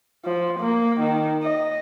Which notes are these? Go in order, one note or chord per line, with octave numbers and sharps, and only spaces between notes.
F3
A#3
D#3
D#5